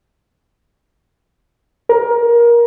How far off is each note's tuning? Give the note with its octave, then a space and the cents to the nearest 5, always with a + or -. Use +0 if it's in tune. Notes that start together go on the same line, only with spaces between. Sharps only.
A#4 +20